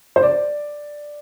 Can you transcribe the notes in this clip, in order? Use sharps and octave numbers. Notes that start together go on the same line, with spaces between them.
C5
D5